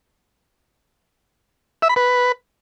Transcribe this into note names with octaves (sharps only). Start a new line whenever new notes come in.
E5
B5
B4